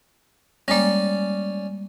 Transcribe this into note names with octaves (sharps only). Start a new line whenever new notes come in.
G3 G#3 A#3 C#4 D5